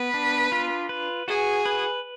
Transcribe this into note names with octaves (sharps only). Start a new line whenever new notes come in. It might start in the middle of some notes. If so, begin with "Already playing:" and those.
Already playing: B3 B4
D4
F4
B4
F#4 G#4
B4